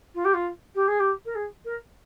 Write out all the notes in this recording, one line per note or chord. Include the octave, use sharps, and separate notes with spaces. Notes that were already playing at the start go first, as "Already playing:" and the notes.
F4
G4
F4
G4
G#4
G4
A#4
G#4
A#4